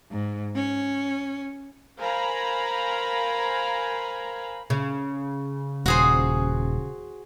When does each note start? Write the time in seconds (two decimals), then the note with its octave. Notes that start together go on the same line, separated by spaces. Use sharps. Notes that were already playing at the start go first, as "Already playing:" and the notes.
0.11 G#2
0.55 C#4
1.97 A#4 C5 F5 G#5 A#5 B5
4.70 C#3
5.86 D#1 F#4 G#4 C5